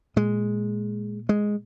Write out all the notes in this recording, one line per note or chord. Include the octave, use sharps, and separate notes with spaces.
A#2 G#3
G#3